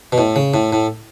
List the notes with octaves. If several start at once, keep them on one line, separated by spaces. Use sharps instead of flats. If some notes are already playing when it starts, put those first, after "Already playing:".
B2
A2
C#3
A2
A2